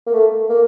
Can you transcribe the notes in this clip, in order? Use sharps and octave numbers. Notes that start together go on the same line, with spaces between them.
A#3
A3
A#3